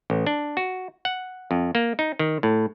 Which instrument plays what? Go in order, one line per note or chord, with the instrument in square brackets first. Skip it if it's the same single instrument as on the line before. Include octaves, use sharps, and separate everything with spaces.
[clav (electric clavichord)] A1
D4
F#4
F#5
F2
A#3
D#4
D#3
A2